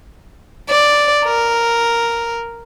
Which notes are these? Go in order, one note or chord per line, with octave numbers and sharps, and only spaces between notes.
D5
A#4